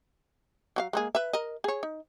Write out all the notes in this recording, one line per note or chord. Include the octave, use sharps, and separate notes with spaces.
F#3 F#4 F5
G#3 A#3 G#4
B4 E5
A#4 D#5
G#4 C#5
D#4